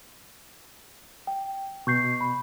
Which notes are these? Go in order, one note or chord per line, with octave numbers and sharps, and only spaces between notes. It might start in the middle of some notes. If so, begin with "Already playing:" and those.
G5
B2 C#6 G6 C7
B5